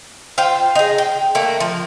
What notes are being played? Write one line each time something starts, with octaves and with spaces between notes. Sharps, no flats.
F4 C5 G5
D#4 G#4
G5
A3 A#3
F3